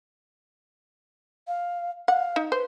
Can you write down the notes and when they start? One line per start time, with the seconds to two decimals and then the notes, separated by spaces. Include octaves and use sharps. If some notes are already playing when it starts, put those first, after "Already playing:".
1.47 F5
2.08 F5 F#5
2.36 D#4
2.52 B4 C5